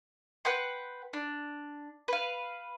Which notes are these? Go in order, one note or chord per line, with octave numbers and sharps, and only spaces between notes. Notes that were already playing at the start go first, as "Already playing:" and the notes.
B4 F#5 G5 C6
D4
B4 F5